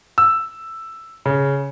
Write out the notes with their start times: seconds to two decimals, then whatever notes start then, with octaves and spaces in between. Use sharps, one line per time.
0.18 E6
1.26 C#3